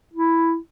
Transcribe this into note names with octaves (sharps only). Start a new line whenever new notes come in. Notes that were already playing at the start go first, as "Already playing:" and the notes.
E4